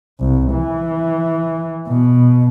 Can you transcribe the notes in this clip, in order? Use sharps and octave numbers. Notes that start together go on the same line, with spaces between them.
C2
E3
B2